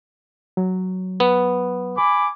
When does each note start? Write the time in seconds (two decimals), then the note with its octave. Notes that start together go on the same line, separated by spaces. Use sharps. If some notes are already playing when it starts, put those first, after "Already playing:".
0.57 F#3
1.20 B3
1.96 G#5 B5 D6